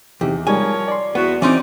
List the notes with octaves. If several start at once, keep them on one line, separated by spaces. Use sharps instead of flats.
E2 C3 D#4 G4
F3 G3 G#3 D#4 A#4 C#5 G#5
D5 C6
E2 B3 F#4
E3 C4 C#4 D#4 D5